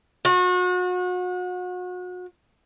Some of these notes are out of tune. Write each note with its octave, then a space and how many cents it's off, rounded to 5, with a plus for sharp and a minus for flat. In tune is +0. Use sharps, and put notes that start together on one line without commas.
F#4 -35